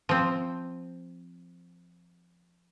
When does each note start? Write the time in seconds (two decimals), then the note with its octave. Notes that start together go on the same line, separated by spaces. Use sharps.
0.09 F3 C4